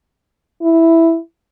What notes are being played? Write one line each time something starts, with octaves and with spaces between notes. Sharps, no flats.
E4